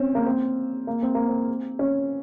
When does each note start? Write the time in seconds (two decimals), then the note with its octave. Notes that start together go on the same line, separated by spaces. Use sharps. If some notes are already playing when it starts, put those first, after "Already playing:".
Already playing: C4 C#4
0.15 A#3
0.26 C4
0.87 A#3
1.03 C4
1.15 A#3
1.28 C4
1.79 C#4